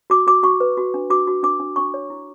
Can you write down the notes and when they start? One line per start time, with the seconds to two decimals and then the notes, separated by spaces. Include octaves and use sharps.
0.10 F#4 D6
0.27 F#4 D6
0.43 F#4 C#6
0.60 B4
0.77 F#4
0.94 D4
1.10 F#4 D6
1.27 F#4
1.43 D4 D6
1.60 D4
1.76 D4 C#6
1.94 C#5
2.10 E4